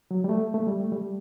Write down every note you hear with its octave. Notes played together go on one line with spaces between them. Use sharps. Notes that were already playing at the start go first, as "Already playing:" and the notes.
F#3
G3
A3
A3
G3
A3
G3